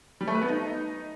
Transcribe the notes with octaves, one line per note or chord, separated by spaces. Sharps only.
G3
A3
B4
B3
D#4